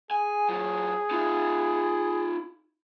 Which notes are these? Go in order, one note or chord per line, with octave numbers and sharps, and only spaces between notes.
G#4 G#5
F#3 F4
D#4 F4